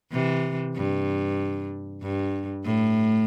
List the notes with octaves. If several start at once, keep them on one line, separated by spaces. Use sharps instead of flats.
C3 E3
G2
G2
A2